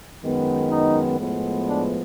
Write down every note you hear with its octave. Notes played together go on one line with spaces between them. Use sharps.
F#2 D#3 G#3 B3
D#4
A2 F3 G#3 B3
D4